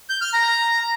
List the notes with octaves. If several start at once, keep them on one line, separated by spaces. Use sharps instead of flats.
G6
F6
A#5